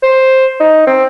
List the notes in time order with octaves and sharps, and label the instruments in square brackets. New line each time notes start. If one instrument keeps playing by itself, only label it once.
[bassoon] C5
D#4
C4